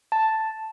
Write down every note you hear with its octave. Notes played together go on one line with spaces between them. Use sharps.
A5